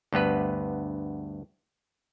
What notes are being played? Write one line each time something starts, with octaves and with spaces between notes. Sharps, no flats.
D2 G2 B3 B4